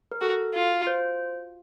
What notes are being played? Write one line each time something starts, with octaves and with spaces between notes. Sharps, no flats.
A#4
F#4 A4
F4
C5